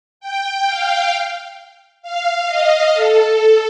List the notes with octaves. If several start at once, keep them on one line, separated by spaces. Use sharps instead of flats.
G5
F5
F5
D#5
A4